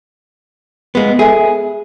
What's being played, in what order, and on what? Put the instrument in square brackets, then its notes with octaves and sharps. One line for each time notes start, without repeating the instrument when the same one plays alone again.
[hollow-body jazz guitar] G#3 B3
[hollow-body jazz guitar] G#4 [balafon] A4 E5 G#5